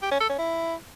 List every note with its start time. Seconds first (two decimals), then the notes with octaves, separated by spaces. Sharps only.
0.02 G4
0.11 C#4
0.20 A4
0.29 C#4
0.39 E4